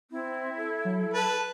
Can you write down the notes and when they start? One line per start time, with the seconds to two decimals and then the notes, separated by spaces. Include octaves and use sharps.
0.11 C4 E4
0.57 A4
0.85 F#3
1.14 B4 A5